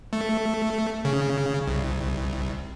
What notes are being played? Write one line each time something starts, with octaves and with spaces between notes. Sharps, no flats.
A3
C#3
C2